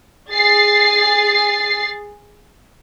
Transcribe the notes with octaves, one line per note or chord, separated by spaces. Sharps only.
G#4 A6 C7